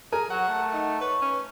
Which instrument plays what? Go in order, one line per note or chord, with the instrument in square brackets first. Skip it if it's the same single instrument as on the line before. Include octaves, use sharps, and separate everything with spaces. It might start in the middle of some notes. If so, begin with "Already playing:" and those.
[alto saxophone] G#4 [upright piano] A#4
[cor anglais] F#3 [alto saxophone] F#5
[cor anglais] A3
[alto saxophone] D#4
[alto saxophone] B4 [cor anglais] C#5
[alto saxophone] C#4